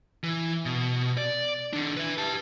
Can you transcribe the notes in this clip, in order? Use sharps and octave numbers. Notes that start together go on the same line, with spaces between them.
E3
B2
D5
D#3 D4
B4 E5
G4 A5